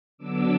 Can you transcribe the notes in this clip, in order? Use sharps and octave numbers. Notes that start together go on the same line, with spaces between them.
D3 F#3 B3 D4 D6 E6